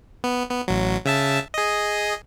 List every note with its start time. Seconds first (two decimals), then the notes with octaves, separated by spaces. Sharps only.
0.24 B3
0.50 B3
0.68 A1 F#3
1.06 C#3 E5 A5
1.54 G#4 D#5